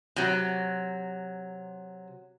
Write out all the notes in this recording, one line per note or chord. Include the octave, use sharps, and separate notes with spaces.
C3 F#3